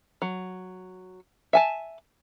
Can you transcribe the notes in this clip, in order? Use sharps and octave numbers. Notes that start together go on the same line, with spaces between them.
F#3
E5 G#5 A5